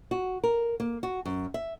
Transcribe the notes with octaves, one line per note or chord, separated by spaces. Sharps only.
F#4
A#4
A#3
F#4
F#2
E5